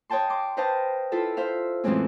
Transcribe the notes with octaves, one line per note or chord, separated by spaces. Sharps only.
C#5 D#5 G5 A5 C6
C6 D6
B4 C5 D#5 F5 G5 A5
E4 F4 A4 E5
C5 E5 F5
F2 A2 E3 G#3 C4 C#4